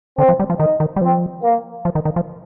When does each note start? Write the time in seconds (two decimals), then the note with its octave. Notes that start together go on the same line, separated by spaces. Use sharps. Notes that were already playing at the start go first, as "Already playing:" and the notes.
0.18 D3 C4
0.29 F3
0.40 G3
0.50 F3
0.59 D#3 D#4
0.80 D#3
0.96 G3
1.01 F3 C4
1.43 A#3
1.85 F3
1.95 D#3
2.05 D#3
2.16 F3